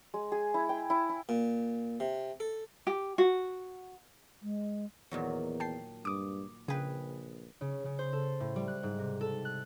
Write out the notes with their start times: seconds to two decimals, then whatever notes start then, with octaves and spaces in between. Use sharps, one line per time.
0.14 G#3
0.32 G#4
0.54 E4
0.69 G5
0.90 E4
1.09 E4
1.29 A#2
2.00 C3
2.40 A4
2.87 G4
3.18 F#4
4.42 G#3
5.11 E2 A#2 D#3 F#3
5.60 G5 A5 C7
6.05 G2 D6 D#6
6.68 A#1 C#3 G#4 B4 G5
7.61 C#3
7.85 C#3
7.99 C5
8.13 A4
8.40 A2
8.56 G3
8.68 F#6
8.83 G#2
8.99 C3
9.21 A4
9.45 F#6